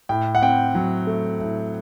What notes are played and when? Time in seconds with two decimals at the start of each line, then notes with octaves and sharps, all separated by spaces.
0.09 A2 G5
0.35 F#5
0.42 C4 G5
0.75 F#3
1.07 A3
1.40 A2